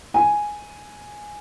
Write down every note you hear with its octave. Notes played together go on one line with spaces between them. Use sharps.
G#5